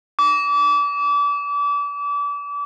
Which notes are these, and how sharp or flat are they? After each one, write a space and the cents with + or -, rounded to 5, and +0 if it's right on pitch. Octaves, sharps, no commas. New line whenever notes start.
D6 -35